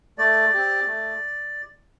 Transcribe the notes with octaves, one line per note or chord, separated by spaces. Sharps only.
A3 D5
C4 G4
A3